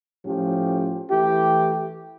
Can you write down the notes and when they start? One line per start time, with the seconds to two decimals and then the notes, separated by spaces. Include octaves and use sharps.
0.24 A2 F3 C#4 G4
1.10 E3 A3 E4 G4